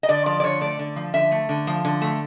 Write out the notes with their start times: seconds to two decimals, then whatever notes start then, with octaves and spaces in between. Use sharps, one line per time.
0.03 D#5
0.08 D3 D5
0.26 F3 D5
0.40 D5
0.44 D3 C#5
0.61 A3 D5
0.79 D3
0.96 F3
1.14 D3 E5
1.31 A3
1.49 D3
1.67 F3
1.85 D3
2.02 A3